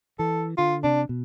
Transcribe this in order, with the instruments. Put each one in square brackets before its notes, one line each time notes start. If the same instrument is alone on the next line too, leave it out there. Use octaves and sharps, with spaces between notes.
[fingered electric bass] E3 [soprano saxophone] A4
[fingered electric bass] D3 [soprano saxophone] F4
[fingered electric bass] C3 [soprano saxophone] D4
[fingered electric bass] B2